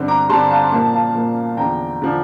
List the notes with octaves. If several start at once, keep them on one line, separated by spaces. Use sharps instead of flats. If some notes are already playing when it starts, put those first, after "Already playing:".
Already playing: G2 D3 G3 C4
A#5 D6
G2 D3 G3 C4 A5 C6
F5 A5
A#2 F3 A#3 F5 A5
F5 A5
A#2 F3 A#3
E2 D3 F3 G5 A#5
D3 F3